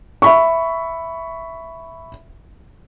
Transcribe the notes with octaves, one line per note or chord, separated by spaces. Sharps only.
E5 B5 C#6